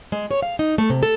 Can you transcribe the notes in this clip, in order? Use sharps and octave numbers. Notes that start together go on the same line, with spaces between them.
G#3
C#5
F5
D#4
A3
C3
A4